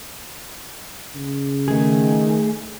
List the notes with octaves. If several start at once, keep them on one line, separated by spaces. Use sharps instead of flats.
C#3
D#3 A3 G#4